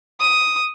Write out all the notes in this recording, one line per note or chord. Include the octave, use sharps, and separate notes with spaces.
D#6